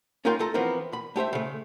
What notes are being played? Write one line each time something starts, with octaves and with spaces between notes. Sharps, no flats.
C#4 D#4 F4 A#4 G5 C6
A3 F4 A4 A#5
E3 F3 B3 C4 A#4
B5
A3 G4 C5 E5
C#3 A3